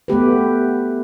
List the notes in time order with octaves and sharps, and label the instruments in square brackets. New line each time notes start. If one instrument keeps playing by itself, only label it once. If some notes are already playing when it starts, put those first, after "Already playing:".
[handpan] A3 B3 G4 B4